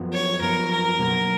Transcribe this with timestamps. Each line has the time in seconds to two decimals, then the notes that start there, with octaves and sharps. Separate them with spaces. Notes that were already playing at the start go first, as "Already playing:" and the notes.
Already playing: F#2 F3 B3
0.13 C#5
0.41 F#2 F3 B3 A#4
0.71 A#4
0.99 B2 F#3 A#3